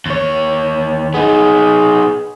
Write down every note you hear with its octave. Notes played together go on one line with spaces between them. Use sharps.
D#2 C#5
B3 D#4 G#4